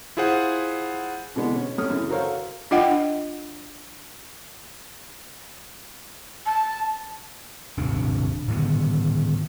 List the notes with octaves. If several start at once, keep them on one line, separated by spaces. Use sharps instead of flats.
E4 F4 G#4 C5 F#5
B2 D3 E3 G#3 B3
C#4
F#3 A3 C#4 D#6 F6
F#2 C#3 E3
F#4 A4 A#4 C5 C#5 F5
D4 F4 D#5 F#5 G5
A5
D#1 G#1 C3 D4
A2 D3 D#3 B3